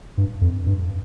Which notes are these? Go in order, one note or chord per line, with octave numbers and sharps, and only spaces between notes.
G2
F2
G2